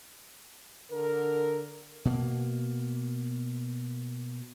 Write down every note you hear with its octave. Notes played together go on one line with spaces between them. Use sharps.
D3 A#4
B2 A#3